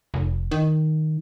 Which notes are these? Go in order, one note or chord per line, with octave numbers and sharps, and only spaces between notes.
F1
D#3